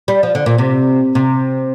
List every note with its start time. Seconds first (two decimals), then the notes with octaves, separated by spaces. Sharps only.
0.08 G3
0.23 F3
0.35 D3
0.46 A#2
0.58 C3
1.15 C3